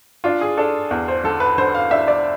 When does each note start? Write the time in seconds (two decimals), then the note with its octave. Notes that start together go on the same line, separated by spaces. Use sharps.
0.24 D4 F4
0.41 G#4
0.57 D4 A4
0.91 E2
1.08 C5
1.24 D3 A4
1.40 B4
1.58 D3 C5
1.75 F5
1.91 D4 E5
2.08 D5